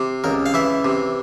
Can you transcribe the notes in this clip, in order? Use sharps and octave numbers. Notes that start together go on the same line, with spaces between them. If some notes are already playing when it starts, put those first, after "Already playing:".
Already playing: C3
C#2 A#4
F5
E3 E5
C3